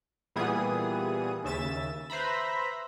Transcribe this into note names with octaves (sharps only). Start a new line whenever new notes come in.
A#2 E3 G3 B3 G#4 D#6
D#2 C#3 E5 A6 E7
B4 C5 E5 A#5 B5